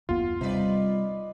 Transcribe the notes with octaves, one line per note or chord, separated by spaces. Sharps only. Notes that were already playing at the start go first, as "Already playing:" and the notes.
F#1 D#2 B3 F4
C3 G3 D#4 B4 D5